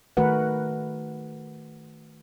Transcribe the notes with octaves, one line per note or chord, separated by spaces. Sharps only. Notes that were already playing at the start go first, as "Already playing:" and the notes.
D#3 A3 F#4 A#4 B4 F#5